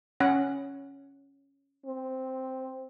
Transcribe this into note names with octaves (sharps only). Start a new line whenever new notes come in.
C#4 F#5
C4